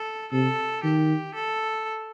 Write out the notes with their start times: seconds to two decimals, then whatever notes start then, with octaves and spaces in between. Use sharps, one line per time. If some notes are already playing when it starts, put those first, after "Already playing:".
Already playing: A4
0.32 C3 A4
0.84 D#3 G4
1.35 A4